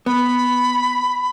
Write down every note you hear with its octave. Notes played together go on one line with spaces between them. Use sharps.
B3 B5